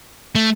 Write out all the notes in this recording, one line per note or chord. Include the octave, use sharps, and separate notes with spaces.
A3